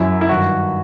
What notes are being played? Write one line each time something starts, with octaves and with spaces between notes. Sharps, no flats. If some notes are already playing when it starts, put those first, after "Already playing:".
Already playing: F#2 F#3 E4
E4
G2 D#3 F#3 F#4